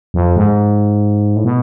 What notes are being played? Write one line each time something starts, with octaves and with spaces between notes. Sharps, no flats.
F2
G#2
A2
B2